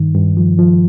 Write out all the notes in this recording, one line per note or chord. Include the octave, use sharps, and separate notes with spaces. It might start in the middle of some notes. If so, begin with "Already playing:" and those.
Already playing: G2 D#3
G2
F3
F3